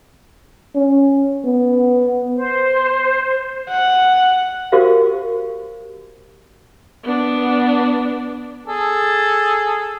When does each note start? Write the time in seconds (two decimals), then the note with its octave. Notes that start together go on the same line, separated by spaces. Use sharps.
0.75 C#4
1.45 B3
2.35 C5
3.69 F#5
4.72 F#4 G4 A#4 C5 F5
7.03 B3 D4
8.67 G#4 A4